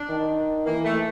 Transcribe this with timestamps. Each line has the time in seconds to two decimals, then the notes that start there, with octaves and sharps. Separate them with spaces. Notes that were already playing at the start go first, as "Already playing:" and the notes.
Already playing: D4
0.09 D#3
0.66 E3 A#3
0.84 A3